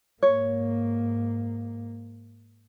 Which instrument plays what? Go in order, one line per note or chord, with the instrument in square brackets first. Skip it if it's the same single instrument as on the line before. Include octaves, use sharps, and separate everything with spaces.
[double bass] G#2 A#3 [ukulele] C#5